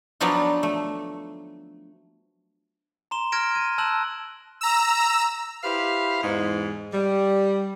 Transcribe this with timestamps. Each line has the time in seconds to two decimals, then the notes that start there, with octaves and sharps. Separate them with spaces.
0.20 F3 F#3 B3 D4 D#4 F4
0.63 A3
3.11 A#5 C6 E7 G7
3.32 F6 G#6 A#6 D7 E7
3.55 D#7
3.78 A5 E6 F#6 E7 F#7
4.61 A#5 E6
5.63 E4 G4 B4 C5 F5
6.23 E2 G#2
6.93 G3